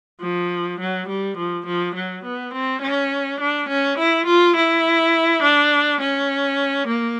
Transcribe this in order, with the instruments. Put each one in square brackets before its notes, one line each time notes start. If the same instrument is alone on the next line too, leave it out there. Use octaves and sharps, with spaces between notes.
[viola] F3
F#3
G3
F3
F3
F#3
B3
C4
C#4
D4
C#4
E4
F4
E4
D4
C#4
A#3